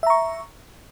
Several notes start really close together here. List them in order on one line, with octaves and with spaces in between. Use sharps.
E5 A#5 C#6